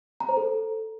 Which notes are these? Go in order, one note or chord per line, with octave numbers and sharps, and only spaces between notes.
A#5
C5
A4